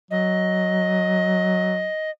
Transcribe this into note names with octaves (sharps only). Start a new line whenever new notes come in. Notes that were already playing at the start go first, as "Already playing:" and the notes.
F#3 D#5